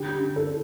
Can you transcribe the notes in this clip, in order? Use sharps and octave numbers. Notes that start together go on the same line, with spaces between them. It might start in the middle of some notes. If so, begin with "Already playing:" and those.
Already playing: D3 G4
D3
A4